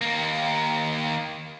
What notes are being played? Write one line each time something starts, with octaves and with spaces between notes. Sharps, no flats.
D#2 A#3